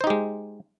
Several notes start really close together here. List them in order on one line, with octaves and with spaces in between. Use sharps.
C5 D#4 G4 G#3